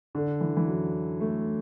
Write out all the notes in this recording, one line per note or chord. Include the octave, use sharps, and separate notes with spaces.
D3
E3
E3
F#3
A3